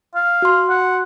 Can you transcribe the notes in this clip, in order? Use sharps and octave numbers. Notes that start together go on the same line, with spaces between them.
F5
F#4 C6
F#5